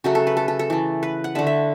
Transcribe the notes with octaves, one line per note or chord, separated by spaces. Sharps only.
C#3 F#3 A3 F#4
A4
B4
A4
A4
A4
E3 A3
B4
F#5
D3 A3 E5
E5